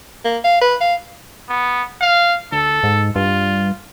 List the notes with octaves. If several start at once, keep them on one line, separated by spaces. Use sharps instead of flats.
A#3
F5
B4
F5
B3
F5
D2 A4
G#2
G2 F4